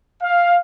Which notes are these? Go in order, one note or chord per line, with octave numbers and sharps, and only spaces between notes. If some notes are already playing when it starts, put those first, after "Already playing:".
F5